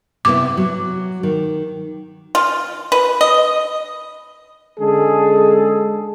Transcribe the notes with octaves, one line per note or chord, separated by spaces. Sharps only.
C3 B3 E4 D6
F#3
D#3
F4
B4
D#5
D3 G#3 C#4 G#4 A4